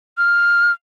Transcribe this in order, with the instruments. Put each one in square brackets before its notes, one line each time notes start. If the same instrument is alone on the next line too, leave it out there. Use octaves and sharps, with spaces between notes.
[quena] F6